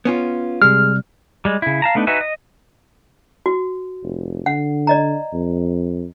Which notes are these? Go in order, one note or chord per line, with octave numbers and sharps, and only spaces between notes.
B3 C#4 F4
C3 G3 G#3 F6
G3 G#3
C#3 E4
F5 A5 A#5
A3 B3 D4 D#4
D#4 F#4 B4 E5 G#5
D#5
F#4
F1
D3 F#5
D5 D#5 A#5
F2